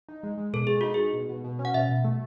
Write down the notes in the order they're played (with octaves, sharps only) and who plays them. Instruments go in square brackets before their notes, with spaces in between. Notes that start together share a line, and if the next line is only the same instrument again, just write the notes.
[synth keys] D#4
G#3
G#3
[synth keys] B2 [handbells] A4
[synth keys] G#3 [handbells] G#4
[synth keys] D#4 [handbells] F#4
[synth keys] G#3 [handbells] G#4
[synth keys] B2
B2
B2
C#4
[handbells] F#5
[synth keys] B2 [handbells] E5
[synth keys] B2
A3